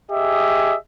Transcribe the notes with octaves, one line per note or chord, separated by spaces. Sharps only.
G4 G#4 D#5 E5